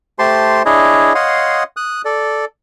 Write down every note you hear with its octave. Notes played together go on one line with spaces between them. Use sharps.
A3 G4 C5 A5 C6
D4 E4 G#4 C#5 D#5
C#5 D#5 F5 F#5 C6 D#6
D#6 F#6
A4 D5